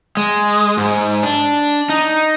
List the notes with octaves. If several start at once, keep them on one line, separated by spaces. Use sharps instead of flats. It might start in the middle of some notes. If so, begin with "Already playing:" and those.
G#3
G#2
D4
D#4